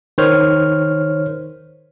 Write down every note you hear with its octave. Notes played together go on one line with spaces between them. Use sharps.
D#3 C5 C#5 F6